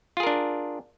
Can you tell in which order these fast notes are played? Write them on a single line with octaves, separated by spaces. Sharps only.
F4 G#4 A#4 D4